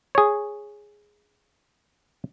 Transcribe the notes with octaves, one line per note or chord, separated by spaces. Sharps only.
G#4 C#5